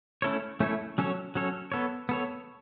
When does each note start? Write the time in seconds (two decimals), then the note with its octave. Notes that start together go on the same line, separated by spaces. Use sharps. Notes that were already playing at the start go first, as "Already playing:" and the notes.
0.22 A3 C#4 E4 A4 C#5
0.60 A3 C#4 E4 A4 C#5
0.98 F#3 C#4 A4 C#5
1.35 F#3 C#4 A4 C#5
1.72 B3 A4 C#5
2.09 B3 A4 C#5